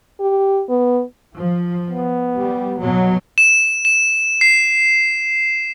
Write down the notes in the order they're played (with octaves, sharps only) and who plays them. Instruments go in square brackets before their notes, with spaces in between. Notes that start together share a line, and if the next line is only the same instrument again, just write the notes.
[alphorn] G4
B3
[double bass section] F3
[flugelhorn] B3
[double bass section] G3
B2 F#3
[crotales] E7
E7
C7